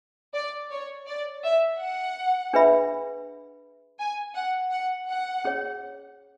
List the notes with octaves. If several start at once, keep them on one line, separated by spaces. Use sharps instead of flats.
D5
C#5
D5
E5
F#5
D4 G#4 B4 E5 B5
G#5
F#5
F#5
F#5
C#4 G#4 C#5